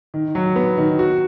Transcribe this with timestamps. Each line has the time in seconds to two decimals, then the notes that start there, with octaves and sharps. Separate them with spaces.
0.14 D#3
0.35 F#3
0.56 B3
0.77 D#3
0.99 F#4